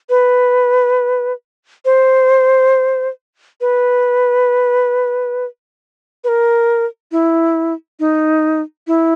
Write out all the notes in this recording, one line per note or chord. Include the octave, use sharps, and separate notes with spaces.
B4
C5
B4
B4
A#4
E4
D#4
E4